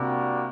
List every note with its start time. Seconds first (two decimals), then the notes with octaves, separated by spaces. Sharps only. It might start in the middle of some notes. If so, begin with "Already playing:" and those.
Already playing: C3 G3 A#3 D4 F#4